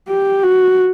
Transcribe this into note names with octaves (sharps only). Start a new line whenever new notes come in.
G4
F#4